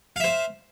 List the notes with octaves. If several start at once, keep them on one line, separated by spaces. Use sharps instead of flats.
C5 E5 F5